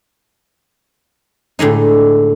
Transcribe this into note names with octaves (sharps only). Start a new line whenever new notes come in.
A2 D3 G#3 D#4